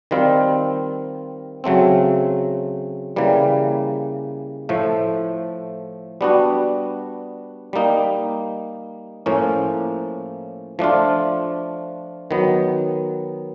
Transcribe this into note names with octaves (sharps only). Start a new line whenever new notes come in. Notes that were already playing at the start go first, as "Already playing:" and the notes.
D#3 G3 C4 F4
C#3 F#3 A3 C4
C#3 E3 G3 A#3
A2 F3 A3
G3 B3 D4 F#4
G3 A#3 D#4
A2 F3 A#3 C#4
F3 A3 D4 F4
D#3 F#3 B3